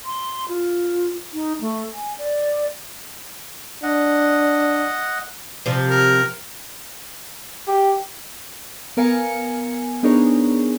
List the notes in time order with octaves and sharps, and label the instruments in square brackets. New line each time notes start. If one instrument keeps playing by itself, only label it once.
[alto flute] C6
F4
D#4
A3
G#5
D5
[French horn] D4 [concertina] D#5 F#5
[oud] C3 F3
[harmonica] A#4
[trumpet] G4
[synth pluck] B3 A#4 F5 G#5 C#7
B3 D4 D#4 G#4 A#4 C#5